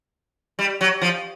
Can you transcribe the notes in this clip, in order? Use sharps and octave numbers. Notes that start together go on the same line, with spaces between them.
G3
F#3
F3